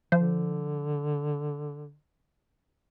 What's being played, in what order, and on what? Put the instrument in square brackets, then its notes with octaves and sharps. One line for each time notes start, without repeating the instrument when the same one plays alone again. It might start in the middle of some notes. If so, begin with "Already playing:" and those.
[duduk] D3 [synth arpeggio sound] F3 C5